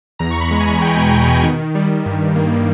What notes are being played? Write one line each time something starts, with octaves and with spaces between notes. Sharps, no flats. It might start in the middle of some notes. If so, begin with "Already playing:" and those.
E2 A#5
E2 C#6
B5
G#3
G#5
E2
E2 G5
B2 G#5
E2 G5
B2 G#5
D#3
D#3
G3
G3
G2
G2
A#3
A#3